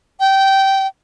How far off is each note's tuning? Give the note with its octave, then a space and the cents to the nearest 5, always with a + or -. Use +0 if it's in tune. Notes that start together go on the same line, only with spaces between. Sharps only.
G5 -15